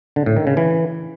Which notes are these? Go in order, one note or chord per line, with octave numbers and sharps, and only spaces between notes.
D3
A2
D#3
C#3
E3